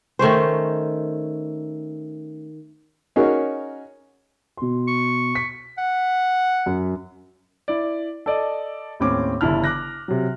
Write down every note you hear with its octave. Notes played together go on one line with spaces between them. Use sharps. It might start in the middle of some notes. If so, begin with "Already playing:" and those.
D#3 A3 C#4 C5
C#4 D#4 F#4 G#4 A#4 C#5
B2 C6
C#6
B6
F#5
F#2
E4 D5
A4 D5 D#5
D#2 A2 C4 C#4 D6
G1 C#3 E3 E4 A5 F6
D6 F#6 A#6
C3 F#3